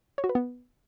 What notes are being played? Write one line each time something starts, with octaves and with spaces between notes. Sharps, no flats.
C#5
F#4
B4
B3